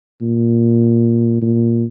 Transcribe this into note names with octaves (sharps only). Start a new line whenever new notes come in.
A#2
A#2